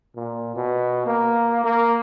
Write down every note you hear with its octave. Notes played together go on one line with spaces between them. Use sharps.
A#2
B2
A#3
A#3